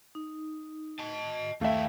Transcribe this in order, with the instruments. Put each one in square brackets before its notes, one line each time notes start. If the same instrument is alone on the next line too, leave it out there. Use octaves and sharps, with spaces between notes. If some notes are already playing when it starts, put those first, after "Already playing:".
[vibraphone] D#4
[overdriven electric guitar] D#5 A5
[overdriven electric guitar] D#2 E4 [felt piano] A3 E5 [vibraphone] F5 G5